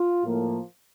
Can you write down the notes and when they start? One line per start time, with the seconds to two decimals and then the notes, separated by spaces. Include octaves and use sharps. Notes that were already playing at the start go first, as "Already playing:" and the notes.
Already playing: F4
0.24 A2 F3 A#3